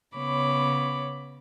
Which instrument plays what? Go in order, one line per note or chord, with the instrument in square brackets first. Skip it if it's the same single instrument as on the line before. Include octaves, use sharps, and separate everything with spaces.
[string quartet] C#3 B3 C#5 B5 D6